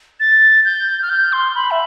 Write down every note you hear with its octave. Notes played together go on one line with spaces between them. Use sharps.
A6
G6
F6
G6
C6
B5
E5